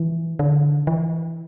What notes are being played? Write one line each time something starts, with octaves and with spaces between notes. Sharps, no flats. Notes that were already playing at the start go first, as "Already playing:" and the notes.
Already playing: E3
D3
E3